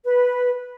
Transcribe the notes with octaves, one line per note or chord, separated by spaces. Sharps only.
B4